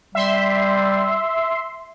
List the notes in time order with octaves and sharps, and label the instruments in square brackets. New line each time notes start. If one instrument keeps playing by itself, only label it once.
[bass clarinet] G3 [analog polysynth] E5 C6